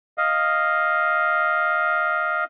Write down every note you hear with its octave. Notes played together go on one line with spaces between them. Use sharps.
D#5 F5